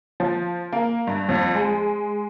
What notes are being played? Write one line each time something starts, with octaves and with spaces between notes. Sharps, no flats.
F3
A#3
G2
F2
G#3